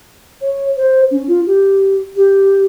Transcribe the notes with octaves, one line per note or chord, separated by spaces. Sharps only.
C#5
C5
C#4
F4
G4
G4